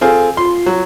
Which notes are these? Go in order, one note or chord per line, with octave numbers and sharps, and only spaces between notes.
C4 F4 G#4 A4
F4 C6
F#3